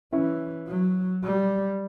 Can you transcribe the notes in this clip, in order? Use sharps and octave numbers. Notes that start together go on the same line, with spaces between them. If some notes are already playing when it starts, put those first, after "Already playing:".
E3 C#4 E4
F#3
G3